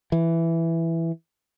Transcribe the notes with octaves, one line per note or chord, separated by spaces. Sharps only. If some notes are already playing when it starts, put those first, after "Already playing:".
E3